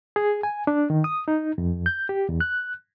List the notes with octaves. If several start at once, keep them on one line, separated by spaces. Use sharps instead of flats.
G#4
G#5
D4
D#3
D#6
D#4
F2
G6
G4
E2
F#6